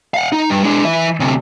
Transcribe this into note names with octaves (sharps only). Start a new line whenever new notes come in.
F5 F#5
D#4
G2
G#3 D4
E3 E5
D2 C3